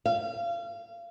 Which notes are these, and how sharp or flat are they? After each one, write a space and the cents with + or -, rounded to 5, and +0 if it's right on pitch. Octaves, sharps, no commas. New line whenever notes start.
F5 -30